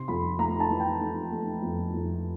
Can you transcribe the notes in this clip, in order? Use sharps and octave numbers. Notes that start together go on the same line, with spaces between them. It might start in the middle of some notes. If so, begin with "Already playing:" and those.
Already playing: C3 C6
F2 B5
A3 A#5
A5
E3
G5
A3
A3
F2
F2